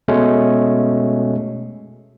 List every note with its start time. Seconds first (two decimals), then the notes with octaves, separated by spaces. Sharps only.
0.08 B2 G#3 A3 C#4